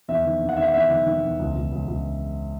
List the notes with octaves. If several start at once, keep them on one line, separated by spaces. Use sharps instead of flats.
E2 E5
D#3
E2
F#5
D#3 E5
F#5
E2 E5
D#3
D#3
E2
C#2
C#2
C#2
C#2